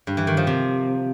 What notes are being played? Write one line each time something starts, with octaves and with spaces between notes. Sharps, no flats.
G2
E3
D#3
F3
C3